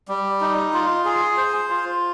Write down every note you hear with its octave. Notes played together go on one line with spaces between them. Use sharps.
G3
D#4
F4
G#4
C5
F4